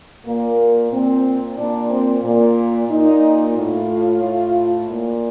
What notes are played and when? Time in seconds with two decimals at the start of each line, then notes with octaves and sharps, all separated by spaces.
0.25 A#2 A#3
0.91 A#2 C4
1.57 A#2 D4
1.90 C4
2.23 A#2
2.89 A#2 D#4
3.55 A2 F4
4.22 A2
4.88 A#2